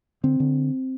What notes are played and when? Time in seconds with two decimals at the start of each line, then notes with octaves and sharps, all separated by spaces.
0.24 D3 C4
0.40 D3